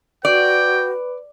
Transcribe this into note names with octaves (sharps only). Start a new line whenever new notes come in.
F#4 B4 D5 G5